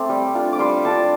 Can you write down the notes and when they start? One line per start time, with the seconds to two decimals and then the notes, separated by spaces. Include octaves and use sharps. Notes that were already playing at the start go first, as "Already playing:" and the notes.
Already playing: A3 C4 C6 D6
0.09 G3
0.34 D4 F4
0.53 D6
0.59 G3 C6
0.85 D4 F4 A5